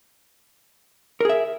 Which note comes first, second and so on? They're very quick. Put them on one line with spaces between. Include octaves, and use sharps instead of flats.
A#4 G#4 E5